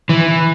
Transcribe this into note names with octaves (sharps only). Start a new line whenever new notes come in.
E3